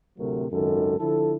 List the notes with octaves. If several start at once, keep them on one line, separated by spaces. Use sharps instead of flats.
D2 A2 C3 F#3 A3 A#4
G#1 C#2 F#2 D#3 A4
D3 F3 E4 A4